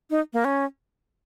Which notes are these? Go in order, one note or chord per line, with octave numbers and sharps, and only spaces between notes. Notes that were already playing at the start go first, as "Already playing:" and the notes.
D#4
A#3
C#4